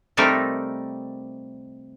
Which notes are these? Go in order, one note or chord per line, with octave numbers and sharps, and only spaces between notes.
C3 G3 A3 C4 D#4 A#4